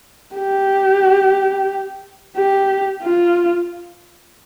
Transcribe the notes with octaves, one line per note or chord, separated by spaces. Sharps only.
G4
G4
F4